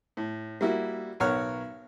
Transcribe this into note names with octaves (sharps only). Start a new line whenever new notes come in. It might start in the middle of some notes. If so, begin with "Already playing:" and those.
A2
G3 A#3 E4 F#4
B1 B3 A#4 C#5 F#5 F6